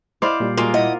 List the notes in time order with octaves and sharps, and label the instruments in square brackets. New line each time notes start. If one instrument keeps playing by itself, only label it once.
[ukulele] E4 D#5 B5 [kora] C5 D5 F5 [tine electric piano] D6
[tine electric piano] A#2 G3
[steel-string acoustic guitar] G#3 [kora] A#3 F4 [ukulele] F#4
[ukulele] E4 F#5 [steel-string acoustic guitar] D#5